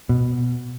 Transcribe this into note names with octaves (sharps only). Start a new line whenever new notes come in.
B2